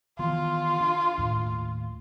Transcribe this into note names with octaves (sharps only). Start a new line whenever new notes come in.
D#3 E3 B3 F4
D4
D#2 A2